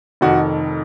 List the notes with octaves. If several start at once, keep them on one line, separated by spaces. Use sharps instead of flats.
F1 F2 D#3 F#4